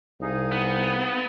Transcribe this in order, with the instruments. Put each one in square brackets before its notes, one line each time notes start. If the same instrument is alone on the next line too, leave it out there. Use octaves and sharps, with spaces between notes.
[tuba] C2 [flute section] D#4 G#4 F5
[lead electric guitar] B3